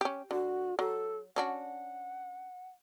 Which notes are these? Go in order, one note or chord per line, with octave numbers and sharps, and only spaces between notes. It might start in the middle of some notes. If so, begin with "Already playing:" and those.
C#4 G4
D3 F#4
F#3 A4
C#4 D4 F#4 F#5